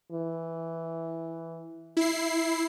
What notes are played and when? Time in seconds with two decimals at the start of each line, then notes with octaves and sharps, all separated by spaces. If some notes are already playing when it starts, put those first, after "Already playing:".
0.12 E3
1.97 E4 C7